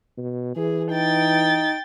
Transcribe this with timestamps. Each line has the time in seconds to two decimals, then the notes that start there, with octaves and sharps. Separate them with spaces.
0.18 B2
0.56 E3 G#4
0.91 D#4 G5 A6